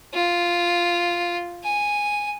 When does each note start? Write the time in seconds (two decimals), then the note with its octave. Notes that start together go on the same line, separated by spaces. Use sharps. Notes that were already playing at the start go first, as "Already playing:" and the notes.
0.14 F4
1.64 G#5